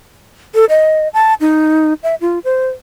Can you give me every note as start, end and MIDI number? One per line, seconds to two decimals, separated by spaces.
0.55 0.65 69
0.69 1.08 75
1.14 1.34 81
1.41 1.94 63
2.03 2.15 76
2.21 2.39 65
2.45 2.67 72